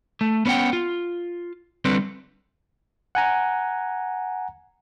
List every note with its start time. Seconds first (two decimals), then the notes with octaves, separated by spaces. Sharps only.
0.21 A3
0.46 B3 C#4 C#5 F#5 G5
0.73 F4
1.85 D3 G3 C4 B4
3.15 F#5 G#5 A#5